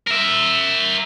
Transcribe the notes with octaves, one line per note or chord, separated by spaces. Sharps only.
A#4 E5